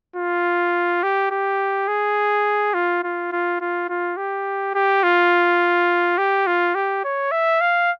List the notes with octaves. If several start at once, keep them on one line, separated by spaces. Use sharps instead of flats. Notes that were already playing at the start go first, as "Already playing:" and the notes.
F4
G4
G4
G#4
F4
F4
F4
F4
F4
G4
G4
F4
G4
F4
G4
C#5
E5
F5